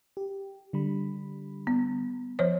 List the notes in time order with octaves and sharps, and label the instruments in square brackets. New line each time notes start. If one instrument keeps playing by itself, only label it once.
[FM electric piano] G4
D3 G3 B5
[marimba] B3
F3 C5 C#5